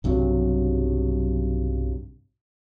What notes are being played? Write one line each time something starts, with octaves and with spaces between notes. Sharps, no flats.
B1 G2 C3 F#3